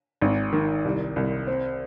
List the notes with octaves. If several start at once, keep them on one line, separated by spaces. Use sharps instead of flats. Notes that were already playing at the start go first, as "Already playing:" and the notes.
G#1
D#3
C2
C2
C4